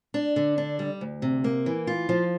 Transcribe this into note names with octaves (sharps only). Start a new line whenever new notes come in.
D4
D3
D4
G3
D2
C3
A#3
E3
F4
F3